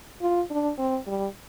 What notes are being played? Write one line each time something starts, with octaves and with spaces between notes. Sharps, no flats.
F4
D4
C4
G3